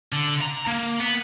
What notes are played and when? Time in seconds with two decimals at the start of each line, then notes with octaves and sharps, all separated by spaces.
0.13 D3
0.41 A#5
0.67 A#3
1.00 B3